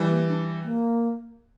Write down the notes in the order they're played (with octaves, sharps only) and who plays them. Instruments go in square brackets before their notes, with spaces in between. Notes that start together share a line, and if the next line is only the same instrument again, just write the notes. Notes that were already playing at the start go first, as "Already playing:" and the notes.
Already playing: [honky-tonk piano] E3 G3
[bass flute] A#3
D4
A#3